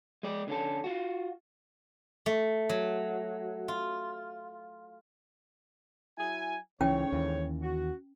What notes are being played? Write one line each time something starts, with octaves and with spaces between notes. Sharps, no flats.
G#3 D5
D3 C#4 A4
F4 F#4
A3
F#3
F4
F#3 E4 G#5
C#2 G#2 D3 E3 C#4 C#5 G5
D#2 E3
F#4